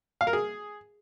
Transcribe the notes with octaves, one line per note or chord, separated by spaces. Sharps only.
F5
A#4
G#4